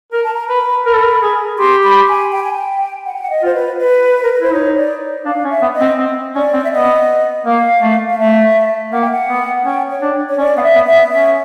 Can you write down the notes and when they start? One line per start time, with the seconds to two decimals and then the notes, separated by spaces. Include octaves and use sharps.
0.12 A#4 A#5
0.24 A5
0.34 A#5
0.49 B4 B5
0.86 A#4 B5
0.95 A4
1.03 A#4
1.22 G#4
1.59 G4 C6
1.84 B5
2.09 G#5
2.32 G5
2.44 G#5
2.54 G5
3.06 F#5
3.14 G5
3.21 F#5
3.30 D#5
3.42 F4 C5
3.55 B4
3.79 B4
4.23 A#4
4.33 B4
4.41 E4 C5
4.53 D#4 C#5
4.77 D5
5.25 D4 F5
5.44 C#4
5.50 E5
5.62 B3
5.74 D#5
5.81 C4
5.99 C4
6.35 C#4 D5
6.53 C4
6.64 E5
6.72 B3 D#5
7.46 A#3 F5
7.82 A3
8.10 F5
8.19 A3 E5
8.92 A#3 F#5
9.02 G5
9.12 F#5
9.29 B3
9.65 C#4 G5
9.90 C#5
10.02 D4
10.29 C#5
10.38 C#4 D5
10.57 B3 F5
10.63 E5
10.75 B3
10.87 E5
10.93 B3
11.12 C#4 E5